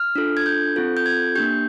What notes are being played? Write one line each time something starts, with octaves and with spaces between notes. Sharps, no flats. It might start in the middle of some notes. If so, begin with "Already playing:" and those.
Already playing: F6
D4 F4 A4
G#6
G6
C4 F4 A4
G6
G#6
A#3 D4 G4 G6